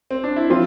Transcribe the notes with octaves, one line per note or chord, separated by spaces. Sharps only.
C4
D4
E4
F3 C4 F4